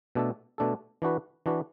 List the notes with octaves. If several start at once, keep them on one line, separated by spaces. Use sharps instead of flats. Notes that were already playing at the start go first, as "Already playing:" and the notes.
B2 A3 D4 A4
B2 A3 D4 A4
E3 D4 F#4 B4
E3 D4 F#4 B4